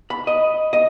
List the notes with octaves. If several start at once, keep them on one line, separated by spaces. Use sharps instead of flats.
B5
D#5
D#5